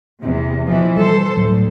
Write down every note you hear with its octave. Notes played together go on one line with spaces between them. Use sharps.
E2 C3
B2 E3 F3
G3 A4 C5
D2 A2 F#3